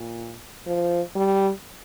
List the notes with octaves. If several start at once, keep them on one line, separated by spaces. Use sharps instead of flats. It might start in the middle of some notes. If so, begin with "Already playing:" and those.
Already playing: A#2
F3
G3